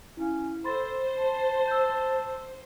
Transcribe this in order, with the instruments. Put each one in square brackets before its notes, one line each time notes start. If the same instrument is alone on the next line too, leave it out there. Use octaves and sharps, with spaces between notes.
[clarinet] C#4 [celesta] E4 F5
[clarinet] A4 [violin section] C5 [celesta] B5 C6 A6
[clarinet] A5
[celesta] E6 G6